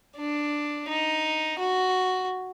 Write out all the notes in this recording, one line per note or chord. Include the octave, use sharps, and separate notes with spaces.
D4
D#4
F#4